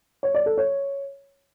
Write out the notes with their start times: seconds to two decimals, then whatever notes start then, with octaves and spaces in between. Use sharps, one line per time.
0.23 C#5
0.35 D5
0.46 A4
0.58 C#5